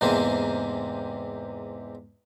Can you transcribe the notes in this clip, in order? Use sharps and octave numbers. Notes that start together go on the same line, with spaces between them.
E2 G#2 C3 A#3 C4